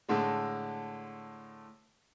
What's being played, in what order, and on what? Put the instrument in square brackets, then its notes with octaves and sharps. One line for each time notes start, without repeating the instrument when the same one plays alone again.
[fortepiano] A2 D3 G#3